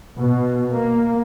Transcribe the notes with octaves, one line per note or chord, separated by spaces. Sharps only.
B2
A#3